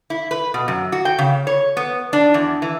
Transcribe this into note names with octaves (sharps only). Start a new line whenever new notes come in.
E4
B4
B2
F#2
F#4
G5
C#3
C#5
B3
D4
E2
E3